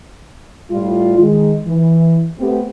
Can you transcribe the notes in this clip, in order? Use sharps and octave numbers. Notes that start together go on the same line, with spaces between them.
A2 G3 F4
D#3 G#3
E3
A3 B3 C4 G4